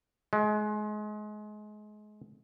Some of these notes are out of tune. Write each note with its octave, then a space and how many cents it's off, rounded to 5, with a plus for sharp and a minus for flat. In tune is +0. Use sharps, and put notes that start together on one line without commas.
G#3 +30